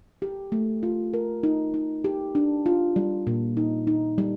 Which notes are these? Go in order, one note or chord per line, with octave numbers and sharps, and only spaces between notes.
G4
A3
F4
A#4
D#4
D#4
G4
D4
F4
G3
A#2
D#4
D#4
G3